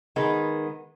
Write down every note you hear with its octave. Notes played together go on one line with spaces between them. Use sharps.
D#3 G#3 B3